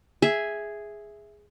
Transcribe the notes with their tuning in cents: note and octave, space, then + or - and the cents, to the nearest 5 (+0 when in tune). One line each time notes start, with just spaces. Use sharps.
G#4 +0 E5 +0